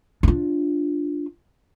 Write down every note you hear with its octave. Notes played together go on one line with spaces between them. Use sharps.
D4 F4